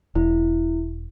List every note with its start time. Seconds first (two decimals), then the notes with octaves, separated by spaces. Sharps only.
0.16 E1 E4